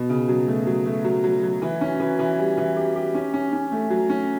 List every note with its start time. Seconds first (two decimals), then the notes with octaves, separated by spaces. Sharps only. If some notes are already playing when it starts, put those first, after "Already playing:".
Already playing: B2
0.10 C#3
0.29 F#3
0.48 A3
0.67 F#3
0.86 A3
1.04 F#3
1.24 F#3
1.43 F#3
1.62 E3
1.81 C#4
2.00 E3
2.19 E3
2.38 G3
2.58 E3
2.76 G4
2.95 G4
3.15 C#4
3.34 C#4
3.53 C#4
3.72 A3
3.90 F#3
4.10 C#4